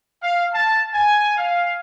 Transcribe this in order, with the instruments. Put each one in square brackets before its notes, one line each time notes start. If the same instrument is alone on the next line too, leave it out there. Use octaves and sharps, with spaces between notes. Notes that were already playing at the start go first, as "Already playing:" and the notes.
[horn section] F5
A5
G#5
F5